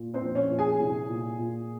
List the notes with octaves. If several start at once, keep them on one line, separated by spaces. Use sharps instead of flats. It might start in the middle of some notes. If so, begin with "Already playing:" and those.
Already playing: A#2
C4 C5
A#1
C#4 C#5
A#1
G#4 G#5
C2
A#2
A#2